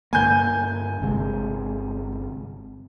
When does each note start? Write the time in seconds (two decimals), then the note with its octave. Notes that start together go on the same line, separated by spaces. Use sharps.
0.13 G2 D3 A#3 G#5 G6
1.01 G1 C3 G#3